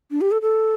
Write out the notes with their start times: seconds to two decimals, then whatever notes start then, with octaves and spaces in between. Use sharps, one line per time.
0.11 D4
0.21 G4
0.31 A4
0.42 A4